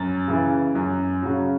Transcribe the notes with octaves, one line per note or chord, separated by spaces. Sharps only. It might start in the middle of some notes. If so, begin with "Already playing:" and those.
Already playing: F#2 A6
C#3 E3
F#2
C#3 F#3